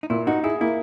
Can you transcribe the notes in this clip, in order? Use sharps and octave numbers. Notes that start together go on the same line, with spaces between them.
D#4
A#2 E4
D#4 F#4
E4 G#4
A#3 E4